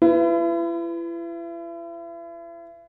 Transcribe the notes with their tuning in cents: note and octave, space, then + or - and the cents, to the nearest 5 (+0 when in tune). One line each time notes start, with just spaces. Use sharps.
E4 +40 B4 +20